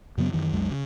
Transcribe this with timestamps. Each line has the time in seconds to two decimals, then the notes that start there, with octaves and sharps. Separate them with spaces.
0.18 F#2 C#3 F#3 B3
0.33 F#2 D#3 E3
0.53 B1 F2 F#3 G#3
0.71 C#3